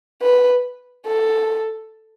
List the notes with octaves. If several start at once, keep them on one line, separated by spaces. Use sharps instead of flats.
B4
A4